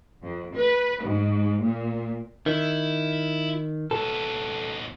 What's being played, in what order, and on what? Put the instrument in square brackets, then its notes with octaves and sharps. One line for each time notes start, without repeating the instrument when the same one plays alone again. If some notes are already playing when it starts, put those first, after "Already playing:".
[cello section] F2
B4
G#2
A#2
[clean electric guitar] D#3 [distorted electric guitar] E4
[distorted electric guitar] C2 B3 [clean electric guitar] A4